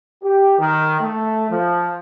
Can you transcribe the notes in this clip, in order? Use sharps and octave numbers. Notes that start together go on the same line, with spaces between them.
G4
D#3
A3
F3